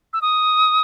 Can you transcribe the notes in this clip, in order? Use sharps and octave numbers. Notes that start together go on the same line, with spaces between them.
E6
D#6